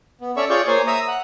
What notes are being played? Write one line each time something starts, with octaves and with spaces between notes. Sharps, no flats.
B3
C#4 A4 C#5 D5 E5 C#6
F4 G#4 C#5 D5 C#6 G6
A#3 C5 C#5 G#5
E5 A#5 D#6
F#5